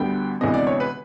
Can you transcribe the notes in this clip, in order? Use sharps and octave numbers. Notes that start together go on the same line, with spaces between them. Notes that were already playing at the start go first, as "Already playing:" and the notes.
Already playing: D2 D3 G3 B3 G5
D2 C3 E3 G#3 B3 D#5
D5
C#5
B4